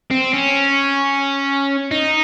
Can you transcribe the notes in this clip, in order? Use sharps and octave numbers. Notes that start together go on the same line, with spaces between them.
C4
C#4
D#4